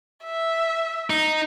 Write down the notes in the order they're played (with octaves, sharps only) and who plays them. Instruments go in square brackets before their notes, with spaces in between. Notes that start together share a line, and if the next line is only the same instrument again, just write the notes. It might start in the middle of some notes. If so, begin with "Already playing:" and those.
[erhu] E5
[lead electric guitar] D#4